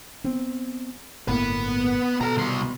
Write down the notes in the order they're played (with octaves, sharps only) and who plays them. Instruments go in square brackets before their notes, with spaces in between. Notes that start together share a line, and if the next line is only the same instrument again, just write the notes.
[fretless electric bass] B3 C4
[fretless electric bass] G1 A2 A#3 [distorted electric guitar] B3 B4
[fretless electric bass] B2 [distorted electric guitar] A4 A#5
[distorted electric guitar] C2 C6